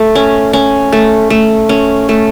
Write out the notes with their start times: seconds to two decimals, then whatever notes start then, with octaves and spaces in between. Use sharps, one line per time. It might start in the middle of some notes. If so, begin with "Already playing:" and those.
Already playing: A3
0.15 C#4
0.53 C#4
0.92 A3
1.30 A3
1.69 C#4
2.09 A3